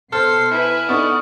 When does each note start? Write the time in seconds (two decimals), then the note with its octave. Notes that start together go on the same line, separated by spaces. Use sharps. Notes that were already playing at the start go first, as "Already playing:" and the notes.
0.13 B2 A4 C5 C6 F6 C7
0.51 E4 B4 G#5
0.89 B3 D#4 A4 D5 F#5 C#6 D#6